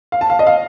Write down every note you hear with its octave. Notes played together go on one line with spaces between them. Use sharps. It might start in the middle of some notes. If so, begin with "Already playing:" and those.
F5
A5
F5
D#5
F5